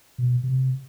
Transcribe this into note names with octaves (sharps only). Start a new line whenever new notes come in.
B2
C3